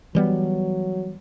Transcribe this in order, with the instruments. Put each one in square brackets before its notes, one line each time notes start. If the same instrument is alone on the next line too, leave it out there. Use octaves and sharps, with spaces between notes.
[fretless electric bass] E3 G3 B3 [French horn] F#3